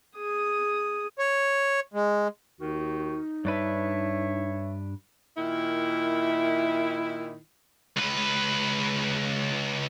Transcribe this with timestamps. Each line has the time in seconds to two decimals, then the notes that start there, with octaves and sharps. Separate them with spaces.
0.16 G#4 D#6
1.19 C#5
1.94 G#3
2.60 D#2 D#3 D#4 F#4
3.45 G2 D4 B4 C#5 E5
5.36 A#2 D#3 E4
7.96 C#2 B4